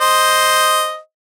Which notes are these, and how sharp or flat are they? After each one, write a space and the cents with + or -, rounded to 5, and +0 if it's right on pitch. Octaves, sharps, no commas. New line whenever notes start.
C5 +0 D#5 +0